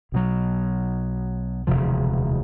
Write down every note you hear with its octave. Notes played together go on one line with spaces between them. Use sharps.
B1 B2 F#3
E1 D2 C3 F3